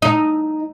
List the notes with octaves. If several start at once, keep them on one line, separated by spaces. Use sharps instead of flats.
D#4